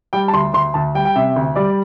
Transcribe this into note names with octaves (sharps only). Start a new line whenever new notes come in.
G3 G5
A5
D2 C6
D2 C6
D2 A5
G3 G5
G5
C3 E5
D2
G3 D5